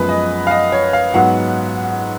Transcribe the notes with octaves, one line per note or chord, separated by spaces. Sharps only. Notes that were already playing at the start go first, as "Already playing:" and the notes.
Already playing: F#2 F3 G#3 B3 B4
D#5
F5
D#5
C#5
F5
G#2 F#3 B3 F#5